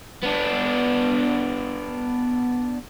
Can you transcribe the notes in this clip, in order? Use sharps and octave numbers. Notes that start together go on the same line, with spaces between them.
B3 D4